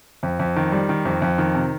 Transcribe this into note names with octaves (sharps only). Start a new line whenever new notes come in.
F2
F2
D#3
G3
D#3
F2
F2
D#3
C3